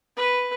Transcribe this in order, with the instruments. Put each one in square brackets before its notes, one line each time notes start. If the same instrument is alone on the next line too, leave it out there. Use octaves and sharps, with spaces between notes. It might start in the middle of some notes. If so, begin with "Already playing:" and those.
[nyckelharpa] B4